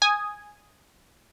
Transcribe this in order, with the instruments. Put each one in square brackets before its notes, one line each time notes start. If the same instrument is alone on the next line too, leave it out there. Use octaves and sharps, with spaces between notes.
[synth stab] G#5 D#6